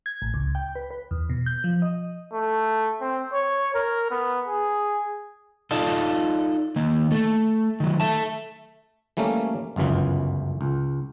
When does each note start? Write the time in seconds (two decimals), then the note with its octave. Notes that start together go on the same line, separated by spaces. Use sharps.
0.06 G#6
0.22 A1
0.34 C#2
0.55 G5
0.75 B4
0.91 B4
1.11 E2
1.30 B2
1.46 G6
1.64 F3
1.82 D#5
2.33 A3
3.01 C4
3.33 C#5
3.75 A#4
4.11 B3
4.48 G#4
5.71 D#4 F4 A4 D5 D#5
6.76 D#3 A#3
7.11 A3 A4
7.80 D#3 F#3
8.00 A4 E5 A5
9.17 E3 G3 A3 A#3 C#4
9.76 G1 C#2 F#2 E3 B3
10.61 C#2